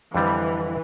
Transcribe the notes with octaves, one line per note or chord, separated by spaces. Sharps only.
F2 D3 E3 G3